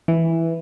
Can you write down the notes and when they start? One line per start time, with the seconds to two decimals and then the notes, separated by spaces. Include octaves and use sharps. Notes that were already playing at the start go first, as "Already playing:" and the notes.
0.08 E3